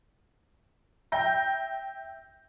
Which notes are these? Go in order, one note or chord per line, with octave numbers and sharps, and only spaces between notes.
E5 G5 G6 A#6